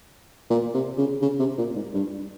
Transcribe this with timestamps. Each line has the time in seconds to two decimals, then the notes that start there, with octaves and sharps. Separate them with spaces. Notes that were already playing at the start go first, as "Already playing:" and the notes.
0.50 A#2
0.74 C3
0.98 C#3
1.22 C#3
1.40 C3
1.58 A#2
1.76 G#2
1.94 G2